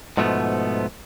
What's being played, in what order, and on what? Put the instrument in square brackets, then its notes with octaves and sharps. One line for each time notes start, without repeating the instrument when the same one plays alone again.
[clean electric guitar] G#2 B2 F3 A3 B3